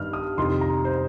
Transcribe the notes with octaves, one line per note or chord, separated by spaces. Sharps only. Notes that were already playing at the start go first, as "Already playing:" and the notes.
Already playing: G2 D#3 F6
D#6
F2 C3 D#3 C6
A#5
C5